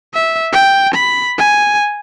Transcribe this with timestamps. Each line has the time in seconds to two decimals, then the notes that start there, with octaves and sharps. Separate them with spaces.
0.14 E5
0.52 G5
0.94 B5
1.38 G#5